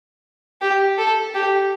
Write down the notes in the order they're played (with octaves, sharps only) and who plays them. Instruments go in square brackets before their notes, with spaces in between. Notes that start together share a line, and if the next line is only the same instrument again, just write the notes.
[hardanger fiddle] G4
A4
G4